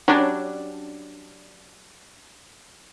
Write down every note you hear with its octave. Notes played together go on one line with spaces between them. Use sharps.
F#3 G3 C#4 D4